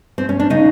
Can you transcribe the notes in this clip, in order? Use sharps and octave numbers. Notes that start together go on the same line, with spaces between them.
C4
C#4
D4
C#3 D#4